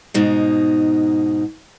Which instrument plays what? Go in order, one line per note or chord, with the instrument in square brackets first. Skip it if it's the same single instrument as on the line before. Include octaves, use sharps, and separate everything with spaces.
[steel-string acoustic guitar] G#2 B2 D#4